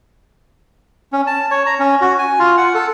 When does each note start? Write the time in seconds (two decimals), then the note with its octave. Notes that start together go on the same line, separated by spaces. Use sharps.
1.13 C#4
1.27 A5
1.51 C#5
1.66 A#5
1.79 C#4
2.01 F#4
2.19 G#5
2.39 F4
2.58 F#5
2.74 A4